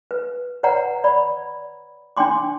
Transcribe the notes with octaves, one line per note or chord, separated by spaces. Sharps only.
B4
B4 C#5 D5 F#5 A#5
D5 B5
D4 G5 G#5 C6 D6